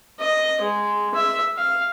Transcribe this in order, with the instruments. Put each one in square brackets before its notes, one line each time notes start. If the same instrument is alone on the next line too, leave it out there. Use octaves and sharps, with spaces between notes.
[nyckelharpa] D#5
G#3
E5
F5